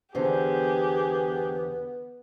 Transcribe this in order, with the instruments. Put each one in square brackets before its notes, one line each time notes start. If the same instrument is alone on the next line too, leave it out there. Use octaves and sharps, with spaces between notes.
[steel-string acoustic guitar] E2 D3 C5 [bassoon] B3 [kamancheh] G4 G#4